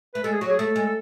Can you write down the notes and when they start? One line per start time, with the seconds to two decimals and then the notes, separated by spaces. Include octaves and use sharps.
0.15 A3 B4
0.24 G#3 A4
0.33 G#4
0.41 F#3 F#4
0.50 G#4
0.58 A3 A4
0.76 G#3
0.86 A4